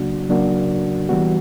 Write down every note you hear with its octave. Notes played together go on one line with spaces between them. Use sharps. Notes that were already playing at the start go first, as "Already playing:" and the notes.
Already playing: C#3 F#3 A#3 D4 F#4
C#3 F#3 A#3 D4 F#4
E3 G3 B3 F#4